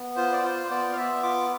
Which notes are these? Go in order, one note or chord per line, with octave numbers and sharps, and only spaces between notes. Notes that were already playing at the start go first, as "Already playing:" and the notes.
Already playing: B3
F4 C5
D5
F4 C5
B3 D5
F5
B3 E5
F4 D6